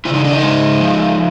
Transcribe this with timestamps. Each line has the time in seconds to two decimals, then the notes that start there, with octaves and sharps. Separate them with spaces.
0.05 C#3 E4
0.14 D#4
0.24 D4
0.33 D#4
0.43 G#3
0.80 F3